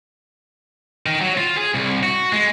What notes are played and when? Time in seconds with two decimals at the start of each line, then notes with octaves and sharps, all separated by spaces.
1.06 D#3
1.21 F#3
1.37 F4
1.57 G#4
1.75 C2
2.03 F#4
2.33 G#3